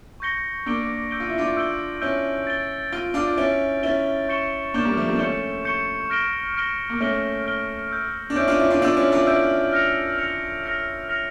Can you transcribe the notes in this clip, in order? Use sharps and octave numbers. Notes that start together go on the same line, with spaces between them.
C#6 G6 A#6 C#7 G7
A#3 D4 E6 G6 D7 G7
E6 G6 D7 G7
F4
E4
D4 F4
E6 G6 D7 G7
C#4 E4 E6 G6 D7 G7
A6 D7 G7
F4 A6 D7 G7
D4 F4
C#4 E4 A6 D7 G7
C#4 E4 A6 D7 G7
C#6 G6 C#7 E7 G7
A#3 D4 C#6 G6 C#7 E7 G7
G3 A#3
F3 A3
G3 A#3
D4
A3 C#4 C#6 G6 C#7 E7 G7
C#6 G6 C#7 E7 G7
F6 A#6 D7 G7
F6 A#6 D7 G7
A#3
A3 C#4 F6 A#6 D7 G7
F6 A#6 D7 G7
E6 G6 D7
D4
C#4 E4 E6 G6 D7
D4 F4
C#4 E4
D4 F4
D4 F4 E6 G6 D7
C#4 E4
D4 F4
C#4 E4 E6 G6 D7
F6 A#6 C#7 F7
F6 A#6 C#7 F7
F6 A#6 C#7 F7
F6 A#6 C#7 F7